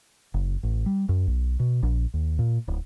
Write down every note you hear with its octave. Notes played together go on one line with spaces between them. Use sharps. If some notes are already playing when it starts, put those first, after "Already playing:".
F#1
A1
G3
F#2
B1
B2
A#1
D#2
A#2
D1